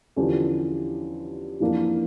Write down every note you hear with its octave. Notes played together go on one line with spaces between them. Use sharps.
E2 D3 F3 C#4 G4
F2 E3 A#3 D4